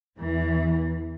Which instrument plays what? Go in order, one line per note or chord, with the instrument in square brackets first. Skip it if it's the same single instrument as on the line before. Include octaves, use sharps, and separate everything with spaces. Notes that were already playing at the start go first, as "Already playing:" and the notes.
[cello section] E2 E3